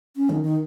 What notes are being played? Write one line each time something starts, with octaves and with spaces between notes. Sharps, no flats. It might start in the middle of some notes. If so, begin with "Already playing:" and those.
C#4
D#3
D#3